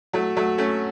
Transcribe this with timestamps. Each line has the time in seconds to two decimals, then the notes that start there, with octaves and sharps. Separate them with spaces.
0.13 F#3 A3
0.37 F#3 A3
0.58 A3 C#4